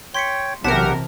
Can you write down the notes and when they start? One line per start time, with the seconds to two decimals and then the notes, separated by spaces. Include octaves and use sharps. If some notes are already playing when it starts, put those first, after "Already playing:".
0.14 C#5 G5 C6 B6 C#7
0.64 B1 C3 E3 G4 A#4 F#5 A5 B6